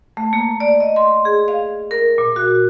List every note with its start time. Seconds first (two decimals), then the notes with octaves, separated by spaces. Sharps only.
0.17 A3
0.33 A#3
0.60 D5
0.80 D#5
0.96 C6
1.25 G#4
1.48 F5
1.91 A#4
2.18 A#2
2.36 F#4